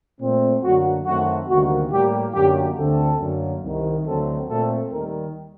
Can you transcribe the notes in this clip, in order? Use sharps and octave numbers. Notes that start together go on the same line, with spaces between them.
A#2 A3 C4
F#2 D3 F#3 A#3 F#4
F#2 D#3 A3 C4 F#4
D2 C3 D#3 G3 A#3 F#4
A2 G3 A#3 G4
F#2 D3 F#3 A#3 G4
D2 D3 A3 C4 A4
F#2 D3 F#3 A#3
C2 C3 D#3
D2 D3 F#3 A3 C4 A4
A#2 A3 C4 A4
D#2 D#3 G3 A#4